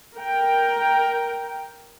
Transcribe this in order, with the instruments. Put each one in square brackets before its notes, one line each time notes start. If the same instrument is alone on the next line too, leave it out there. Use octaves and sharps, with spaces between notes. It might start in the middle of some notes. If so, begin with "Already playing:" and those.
[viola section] A#4 G5